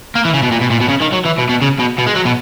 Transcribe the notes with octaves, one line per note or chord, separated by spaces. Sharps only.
A#3
E3
C#3
B2
A#2
B2
A#2
B2
C#3
D#3
F#3
E3
B2
B2
C#3
B2
B2
G#3
F#3
B2